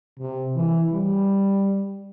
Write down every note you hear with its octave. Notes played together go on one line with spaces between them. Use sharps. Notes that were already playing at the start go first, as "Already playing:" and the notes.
C3
E3
G3